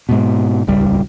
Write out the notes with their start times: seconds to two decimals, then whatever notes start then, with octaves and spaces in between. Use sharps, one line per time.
0.09 G#2 B2
0.67 D#1 G#1 C#2 G3